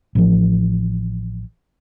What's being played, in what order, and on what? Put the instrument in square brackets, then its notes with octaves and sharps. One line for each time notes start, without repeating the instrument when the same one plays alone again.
[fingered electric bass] A1 F3